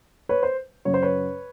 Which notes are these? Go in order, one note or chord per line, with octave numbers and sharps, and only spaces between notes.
B4 C#5
C5
F#2 C#3 F#3 C#5
C5
B4 C#5